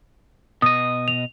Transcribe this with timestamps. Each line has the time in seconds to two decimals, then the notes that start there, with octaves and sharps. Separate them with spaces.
0.62 B2 D#5 D#6
1.08 F7